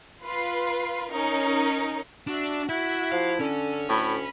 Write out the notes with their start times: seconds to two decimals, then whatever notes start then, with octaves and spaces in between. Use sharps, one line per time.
0.23 F4 B4 C7
1.11 C#4 D#4 A#4
2.27 D4 F#4 E5
2.69 E4 F#4 E5 F#5
3.12 F3 F5
3.40 D3 C#4 A4
3.89 D2 A2 B5